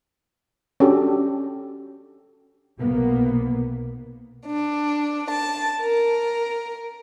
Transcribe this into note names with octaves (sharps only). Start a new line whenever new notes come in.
C#4 D4 F#4 G4 A4
B1 C3 A#3 B3
D4
A5
A#4